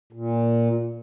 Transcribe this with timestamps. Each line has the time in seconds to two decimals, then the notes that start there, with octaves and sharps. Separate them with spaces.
0.13 A#2